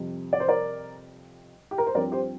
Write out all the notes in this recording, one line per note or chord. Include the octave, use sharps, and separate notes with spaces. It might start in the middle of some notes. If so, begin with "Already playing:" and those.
Already playing: F2 C3 G3
D5
C5
A#4 D5
G4
A#4
C5
G2 F3 C4 A#4 D5
G4 C5